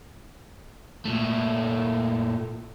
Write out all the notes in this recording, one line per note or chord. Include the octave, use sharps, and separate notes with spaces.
A#2 A3